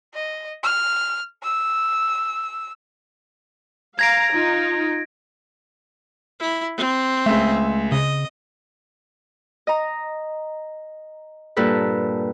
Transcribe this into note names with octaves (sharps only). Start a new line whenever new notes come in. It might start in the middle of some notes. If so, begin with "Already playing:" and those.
D#5
F6
E6
F5 A#5 G#6 A#6 D7
D#4 F4
E4
C4
C#2 A3 E5
C#3 D#5
D#5 A#5
G2 A#2 A4 B4